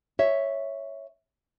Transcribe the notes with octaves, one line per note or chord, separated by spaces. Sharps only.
C#5 E5